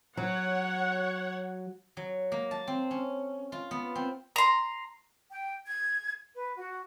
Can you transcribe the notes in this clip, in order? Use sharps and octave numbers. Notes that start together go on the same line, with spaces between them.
F#3 C#5 F#5
F#3
A#3
A5
C4
C#4
F4
B3
C4
A#5 C6
G5
G#6
B4
F#4